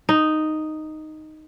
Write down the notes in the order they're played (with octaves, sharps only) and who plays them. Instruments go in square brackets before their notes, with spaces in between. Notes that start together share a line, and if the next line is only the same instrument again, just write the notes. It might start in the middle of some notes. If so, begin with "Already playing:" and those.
[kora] D#4